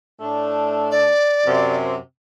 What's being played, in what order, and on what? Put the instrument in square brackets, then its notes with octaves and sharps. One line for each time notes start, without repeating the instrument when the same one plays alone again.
[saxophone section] A2 A3 D4
[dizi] D5
[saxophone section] F#2 C3